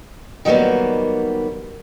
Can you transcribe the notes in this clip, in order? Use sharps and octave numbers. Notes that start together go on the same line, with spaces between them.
D#3 F#3 G3 A#3 B3